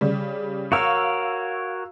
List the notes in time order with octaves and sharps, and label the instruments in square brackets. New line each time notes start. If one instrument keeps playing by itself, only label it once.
[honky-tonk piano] C#3 G3
[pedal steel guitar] F#4 A#4 C#5 [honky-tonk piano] F5 E6